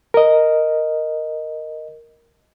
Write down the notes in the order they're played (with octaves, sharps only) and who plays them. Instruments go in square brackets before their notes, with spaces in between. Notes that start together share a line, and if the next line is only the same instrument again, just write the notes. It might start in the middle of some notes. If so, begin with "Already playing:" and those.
[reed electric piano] A#4 D#5